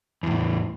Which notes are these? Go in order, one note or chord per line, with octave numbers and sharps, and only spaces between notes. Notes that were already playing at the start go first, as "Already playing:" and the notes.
E2 A2 C#3